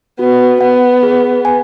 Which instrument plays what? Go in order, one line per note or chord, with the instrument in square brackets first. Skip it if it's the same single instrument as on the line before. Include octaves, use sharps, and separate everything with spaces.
[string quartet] B3 [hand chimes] F#4
[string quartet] B3 [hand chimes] F#5
[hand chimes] G#4
G#5